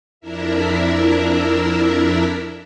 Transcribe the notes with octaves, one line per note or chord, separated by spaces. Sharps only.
F2 D4 E4 A#4 E5